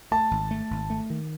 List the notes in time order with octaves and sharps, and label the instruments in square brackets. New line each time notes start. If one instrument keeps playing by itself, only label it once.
[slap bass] A3 [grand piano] A5
[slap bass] G#1
A3
G#1
A3
D#3